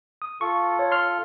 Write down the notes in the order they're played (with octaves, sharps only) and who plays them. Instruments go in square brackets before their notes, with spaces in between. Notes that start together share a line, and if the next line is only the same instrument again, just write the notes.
[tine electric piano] D#6
[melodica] F4 A4 [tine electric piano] C#6
[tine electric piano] C#5
C6 F6